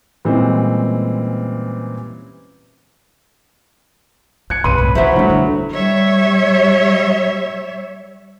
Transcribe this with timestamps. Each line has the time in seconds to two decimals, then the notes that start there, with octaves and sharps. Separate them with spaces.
0.25 A#2 E3 G3 G#3 C4 C#4
4.50 D#4 F#6 G#6 C#7
4.64 C2 G2 C#3 B4 C6 D#7
4.78 C2 A2
4.95 E3 F#3 C#4 E4 C5 E5
5.16 D2 G2 D3 G3 A3
5.30 D3
5.74 G3 C#5 E5